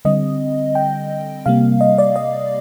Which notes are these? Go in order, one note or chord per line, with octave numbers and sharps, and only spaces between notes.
D3 G3 C4 D#5
G5
C3 G3 A#3 F5
D#5
D5
D#5